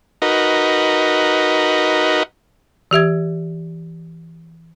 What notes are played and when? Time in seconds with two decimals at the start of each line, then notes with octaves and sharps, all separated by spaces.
0.22 D#4 F#4 A#4 B4 D#5
2.91 E3 G4 E5 G#6